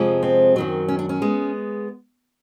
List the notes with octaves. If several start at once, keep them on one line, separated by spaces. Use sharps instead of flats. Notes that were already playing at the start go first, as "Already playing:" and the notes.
Already playing: F2 C3 F3 G#3
C4
F#2 D#3 F#3
C#4
D4
C#4
G#3 B3